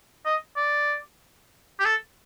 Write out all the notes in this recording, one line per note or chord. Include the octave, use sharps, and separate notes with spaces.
D#5
D5
G4
A4